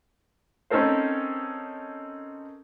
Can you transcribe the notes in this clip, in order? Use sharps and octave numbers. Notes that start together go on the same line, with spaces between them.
C4 C#4 D#4 A4 A#4 C5